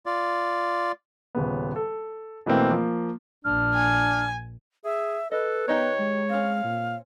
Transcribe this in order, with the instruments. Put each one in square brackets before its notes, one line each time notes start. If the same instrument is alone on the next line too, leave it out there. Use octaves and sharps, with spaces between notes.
[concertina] F4 D5
[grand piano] D#1 C#3 B3
A4
B2 E3 A3 A#3 C4
F3 A#3
[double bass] A#1 [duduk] D4 [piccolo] F6
[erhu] G#5
[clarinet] G#4 [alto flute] E5
[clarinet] A4 [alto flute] B4 [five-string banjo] D#5
[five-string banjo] D#3 D#4 G4 [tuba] B3 [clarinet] C#5
[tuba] G#3
[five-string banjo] C4 C#4 [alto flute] F5
[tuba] A#2